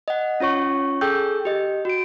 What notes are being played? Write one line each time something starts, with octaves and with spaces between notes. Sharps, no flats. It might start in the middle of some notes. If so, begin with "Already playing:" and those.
D#5 F#5
C#4 F4 C#5 C#6
G#4 A4 G5 E6 G6
G4 D#5
F#4 D7